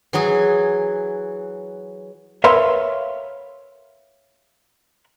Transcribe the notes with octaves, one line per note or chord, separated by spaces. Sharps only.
E3 F#3 F#4 G#4
A#4 B4 C#5 E5 F5 C6